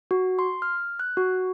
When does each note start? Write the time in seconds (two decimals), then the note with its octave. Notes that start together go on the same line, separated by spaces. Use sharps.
0.11 F#4
0.39 C6
0.62 F6
0.99 F#6
1.17 F#4